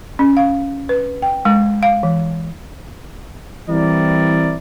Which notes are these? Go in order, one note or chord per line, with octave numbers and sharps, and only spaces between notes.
C#4
F5
B4
G5
G#3
F5
E3
E3 G3 C4 E4 A#4 D5